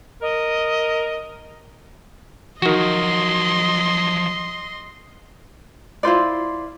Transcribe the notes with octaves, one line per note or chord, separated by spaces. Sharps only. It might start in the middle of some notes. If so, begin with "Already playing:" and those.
A#4 D#5
D#3 F3 F#3 F#4 D#5 C6
E4 F4 C5 D5